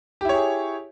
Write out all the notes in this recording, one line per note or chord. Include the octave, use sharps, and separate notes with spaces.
E4 G4 G#4 C#5